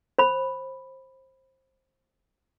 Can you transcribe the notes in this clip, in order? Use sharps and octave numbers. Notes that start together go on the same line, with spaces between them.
C5 B5